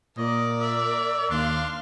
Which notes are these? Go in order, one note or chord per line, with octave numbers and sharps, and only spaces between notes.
A#2 A#4 D5 D#5
E5
D#2 D4 F5 C6 F6